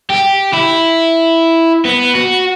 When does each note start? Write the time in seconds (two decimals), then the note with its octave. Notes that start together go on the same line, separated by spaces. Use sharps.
0.10 G4
0.54 E4
1.85 B3
2.14 F#4